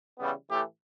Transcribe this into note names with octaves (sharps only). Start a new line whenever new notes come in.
C#3 E3 G3 B3
A2 E3 A3 G4